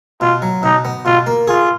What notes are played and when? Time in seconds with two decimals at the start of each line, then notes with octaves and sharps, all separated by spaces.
0.21 B2 F4
0.42 F#3
0.63 B2 D#4
0.85 B3
1.06 B2 F4
1.27 A#3
1.48 F4 G#4